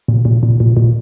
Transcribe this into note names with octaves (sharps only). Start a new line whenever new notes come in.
A#2
A#2
A#2
A#2
A#2